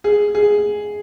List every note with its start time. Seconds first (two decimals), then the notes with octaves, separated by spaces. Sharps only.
0.04 G#4
0.35 G#4